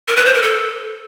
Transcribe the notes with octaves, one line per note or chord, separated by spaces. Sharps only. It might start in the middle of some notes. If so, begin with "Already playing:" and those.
A#4
B4
C5
A#4
A4